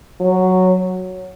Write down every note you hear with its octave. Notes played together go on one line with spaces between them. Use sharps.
F#3